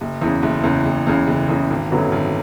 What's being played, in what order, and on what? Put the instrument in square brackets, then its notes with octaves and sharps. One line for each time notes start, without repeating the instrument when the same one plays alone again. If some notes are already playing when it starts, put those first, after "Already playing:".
[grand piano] F#1
E2 C#3
F#1
E2 C#3
F#1
E2 C#3
F#1
E2 C#3
G#1
F#2 D3 F#3 B3
G#1